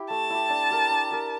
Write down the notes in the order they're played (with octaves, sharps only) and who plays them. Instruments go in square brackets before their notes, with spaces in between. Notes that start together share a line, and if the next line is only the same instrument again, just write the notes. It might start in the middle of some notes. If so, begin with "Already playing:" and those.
Already playing: [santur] E4 G4
[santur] A3 [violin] A5
[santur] E4 G4
D4
G4 A#4
D4
G4 A#4